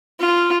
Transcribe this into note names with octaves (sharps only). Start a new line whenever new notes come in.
F4